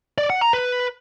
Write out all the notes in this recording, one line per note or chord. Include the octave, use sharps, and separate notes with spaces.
D5
F#5
A#5
B4